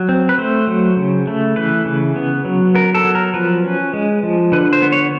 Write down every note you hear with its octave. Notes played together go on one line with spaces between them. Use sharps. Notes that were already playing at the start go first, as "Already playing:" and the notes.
Already playing: F#3
C4
B4
A3 C5
F#3
C#3
A3
E3 B4
C#3
B3
F#3
B3 A#4
A4
F#3
A#4
F3 B4
C#4
G#3
F3
D3 B4
C5
B3
C#5